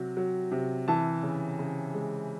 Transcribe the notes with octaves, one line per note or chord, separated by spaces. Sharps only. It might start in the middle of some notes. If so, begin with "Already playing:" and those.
Already playing: C3 F#3
F#3
C3
E3 A5
C#3
C#3
G#3